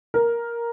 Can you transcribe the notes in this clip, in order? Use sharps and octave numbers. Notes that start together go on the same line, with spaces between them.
A#4